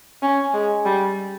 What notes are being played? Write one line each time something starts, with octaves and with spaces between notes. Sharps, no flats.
C#4
G#3
G3